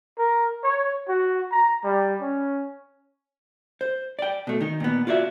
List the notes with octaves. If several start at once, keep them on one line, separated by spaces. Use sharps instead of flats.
A#4
C#5
F#4
A#5
G3
C#4
C5
D5 G5
B2 A3
D#3 D#4
A#2 B3
F4 F#4 D5 E5